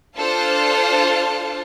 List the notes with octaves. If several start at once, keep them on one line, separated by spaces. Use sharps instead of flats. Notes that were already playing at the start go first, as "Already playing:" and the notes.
D4 F4 A4 C5 F5 A5